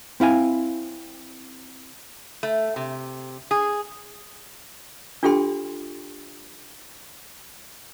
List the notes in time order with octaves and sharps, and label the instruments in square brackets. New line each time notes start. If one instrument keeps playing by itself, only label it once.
[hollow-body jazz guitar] C4 E4 F5 G#5
[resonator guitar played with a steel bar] A3
C3
G#4
[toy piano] D4 F4 G4 A4 G5 C6